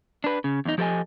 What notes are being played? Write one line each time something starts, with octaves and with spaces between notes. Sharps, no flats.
D4 B4
C#3
E2 D#4
F3 G4 A4 D#5 G#5